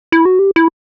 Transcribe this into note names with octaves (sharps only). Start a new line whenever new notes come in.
E4
F#4
G4
E4